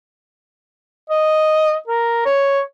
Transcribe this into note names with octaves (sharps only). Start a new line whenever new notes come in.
D#5
A#4
C#5